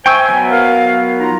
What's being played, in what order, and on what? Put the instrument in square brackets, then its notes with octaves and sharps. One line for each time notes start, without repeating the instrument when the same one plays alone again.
[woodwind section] C5 E5 G#5 [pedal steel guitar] G5 C#6 E6
[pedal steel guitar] F#3 B3
[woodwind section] A#4 F5
D#4 F4 A#5